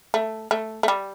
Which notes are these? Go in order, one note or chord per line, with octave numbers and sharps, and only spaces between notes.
A3
A3
A3
G3